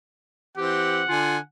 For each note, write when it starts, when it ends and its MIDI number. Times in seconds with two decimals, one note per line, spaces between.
0.57 1.03 52
0.57 1.03 60
0.57 1.02 67
0.57 1.42 78
1.09 1.38 50
1.09 1.37 65
1.09 1.38 80